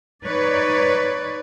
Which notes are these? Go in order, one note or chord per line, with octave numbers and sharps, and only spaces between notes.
D#4 B4 C#5 D5